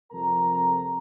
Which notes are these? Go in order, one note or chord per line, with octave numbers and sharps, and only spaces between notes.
F2 C3 F3 A4 A#4 A#5